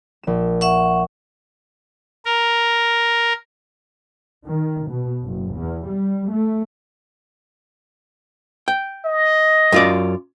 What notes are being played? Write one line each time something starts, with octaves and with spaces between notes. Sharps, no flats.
A#1 E7
E5 F#5 C#6
A#4
D#3
B2
F#1
E2
G3
A3
G5
D#5
F#2 F4 D5